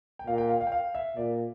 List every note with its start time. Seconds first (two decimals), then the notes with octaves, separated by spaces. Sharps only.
0.19 G5
0.27 A#2 F5
0.38 G5
0.49 F5
0.61 F5
0.67 G5
0.72 F5
0.95 E5
1.17 A#2 D5